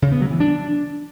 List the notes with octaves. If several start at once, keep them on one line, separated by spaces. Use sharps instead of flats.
C#3
B3
F#3
E3
D4